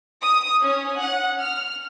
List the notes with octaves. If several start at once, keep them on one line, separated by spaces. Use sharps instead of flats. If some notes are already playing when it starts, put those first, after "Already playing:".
D#6
C#4
F#5
F6